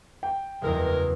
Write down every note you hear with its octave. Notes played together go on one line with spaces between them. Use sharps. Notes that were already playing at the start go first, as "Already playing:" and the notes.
G5
F#1 E2 G#3 A#4